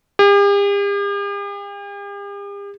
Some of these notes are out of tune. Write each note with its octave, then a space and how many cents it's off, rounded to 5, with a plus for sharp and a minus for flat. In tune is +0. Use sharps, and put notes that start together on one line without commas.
G4 +45